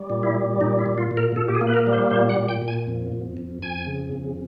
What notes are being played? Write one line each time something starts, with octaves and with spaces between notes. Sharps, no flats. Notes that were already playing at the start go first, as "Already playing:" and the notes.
Already playing: G3
A#2
E4
G3
A#2 D#4
E4
A#2
F4
A#2
A#4
A#2 A4
G4
G#4
A#3
B4
A#4
G3
C5
A#2 C5
F#5
A#2
G5
A#2
G#5
F2
F2
F2
F2 G#5
C#3
F2